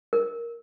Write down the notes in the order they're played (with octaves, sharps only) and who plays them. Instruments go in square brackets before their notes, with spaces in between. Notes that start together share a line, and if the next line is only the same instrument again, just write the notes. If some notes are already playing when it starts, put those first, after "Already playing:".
[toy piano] A#4